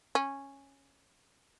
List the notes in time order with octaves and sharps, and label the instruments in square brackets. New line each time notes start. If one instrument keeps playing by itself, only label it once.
[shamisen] C#4